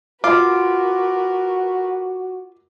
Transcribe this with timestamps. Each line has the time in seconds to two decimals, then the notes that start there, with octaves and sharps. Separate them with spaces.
0.24 F4 F#4 A#4 B4 D6